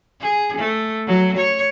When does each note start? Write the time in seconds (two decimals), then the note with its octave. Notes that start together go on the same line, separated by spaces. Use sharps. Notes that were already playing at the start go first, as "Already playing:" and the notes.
0.21 G#4
0.57 A3
1.07 F#3
1.37 C#5